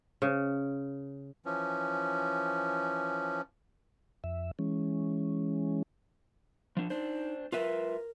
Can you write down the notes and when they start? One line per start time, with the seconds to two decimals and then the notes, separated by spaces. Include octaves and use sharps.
0.22 C#3
1.45 E3 F3 C#4
4.24 F2 E5
4.59 E3 G#3 C#4
6.77 F3 D4
6.90 D4 D#4 C5
7.52 F4 A#4 B4 E5